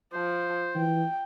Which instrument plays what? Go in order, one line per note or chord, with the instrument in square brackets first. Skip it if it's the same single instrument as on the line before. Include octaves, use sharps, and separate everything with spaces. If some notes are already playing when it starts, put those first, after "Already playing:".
[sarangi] F3 [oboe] C5
[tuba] E3 [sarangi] G5